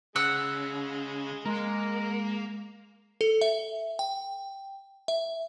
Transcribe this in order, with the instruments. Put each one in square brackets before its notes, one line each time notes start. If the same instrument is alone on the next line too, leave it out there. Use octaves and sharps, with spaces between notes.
[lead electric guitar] C#3 [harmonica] G#3 [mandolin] F#5 E6 F#6
[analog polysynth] G#3 [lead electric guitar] A#3 [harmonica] A#4
[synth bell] A4
E5
G5
E5